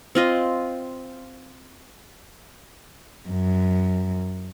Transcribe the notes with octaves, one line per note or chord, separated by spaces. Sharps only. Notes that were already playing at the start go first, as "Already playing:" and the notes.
C4 F4 D#5
F#2